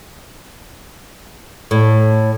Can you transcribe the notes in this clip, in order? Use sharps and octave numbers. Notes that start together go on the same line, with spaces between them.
A2